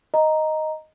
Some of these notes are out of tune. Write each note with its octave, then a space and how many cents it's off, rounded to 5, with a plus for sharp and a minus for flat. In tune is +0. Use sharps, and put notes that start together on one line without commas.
D#5 +0 A#5 +0